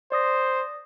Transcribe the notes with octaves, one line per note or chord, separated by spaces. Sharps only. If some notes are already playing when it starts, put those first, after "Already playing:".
C5 D5 D#6 A#6